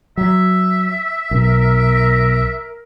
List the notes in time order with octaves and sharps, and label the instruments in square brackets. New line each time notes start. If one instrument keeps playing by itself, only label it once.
[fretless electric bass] F#3 [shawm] E5
[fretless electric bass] B1 [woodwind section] A#4